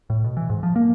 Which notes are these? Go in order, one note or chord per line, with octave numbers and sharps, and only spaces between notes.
A2
B2
E3
G#2
F3
A#3